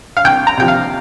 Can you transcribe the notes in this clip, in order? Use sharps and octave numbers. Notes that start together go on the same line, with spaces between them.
F5
C2 G5
A#5
C3 F3 G5
F5